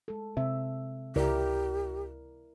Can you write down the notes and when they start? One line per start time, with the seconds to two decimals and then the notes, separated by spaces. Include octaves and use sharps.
0.08 G#3 A4
0.37 C3 E5
1.16 C#2 E4 G4 A#4 D5